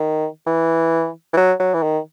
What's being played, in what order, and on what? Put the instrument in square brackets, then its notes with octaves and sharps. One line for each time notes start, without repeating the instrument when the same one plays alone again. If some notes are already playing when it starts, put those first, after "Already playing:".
Already playing: [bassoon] D#3
E3
E3
F#3
F#3
E3
D#3